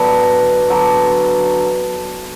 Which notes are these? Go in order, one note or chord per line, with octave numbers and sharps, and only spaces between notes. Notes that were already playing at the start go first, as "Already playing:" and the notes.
Already playing: D3 F#3 B3 D4
D3 F#3 B3 D4